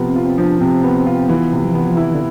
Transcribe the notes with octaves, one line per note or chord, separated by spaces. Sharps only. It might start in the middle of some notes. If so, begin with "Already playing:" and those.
Already playing: C3 F3 B3
C4
F4
C4
F3 D4
C3 C4
B3
F4
E3 B3
C3
F3
E3 B3
F3
E3 E4
E3
D3